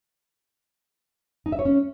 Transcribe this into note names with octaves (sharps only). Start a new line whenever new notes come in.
D#4
E5
C#5
C#4